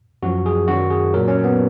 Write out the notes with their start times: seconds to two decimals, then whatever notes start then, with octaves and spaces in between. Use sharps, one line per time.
0.23 F#2 F3 F#4
0.46 G#4
0.68 F#2 D#3 F#3 F#4
0.90 G#4
1.14 A#2 F#3 A#4
1.28 C#4
1.44 B3